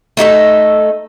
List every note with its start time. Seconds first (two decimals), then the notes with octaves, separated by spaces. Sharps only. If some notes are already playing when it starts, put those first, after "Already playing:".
0.17 A3 D#4 F#4 A4